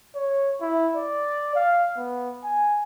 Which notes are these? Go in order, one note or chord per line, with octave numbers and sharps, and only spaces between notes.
C#5
E4
D5
F5
B3
G#5